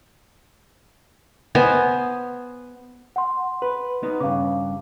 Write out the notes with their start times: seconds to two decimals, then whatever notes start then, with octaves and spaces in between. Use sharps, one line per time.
1.55 B3 C5 D#5 G#5
3.16 F#5 C6
3.62 B4
4.03 B3 D#4
4.20 G2 C#3 F5 D6